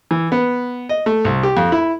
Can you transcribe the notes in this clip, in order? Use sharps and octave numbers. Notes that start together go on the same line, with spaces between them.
E3
B3
D#5
A3
C2
G4
F2
E4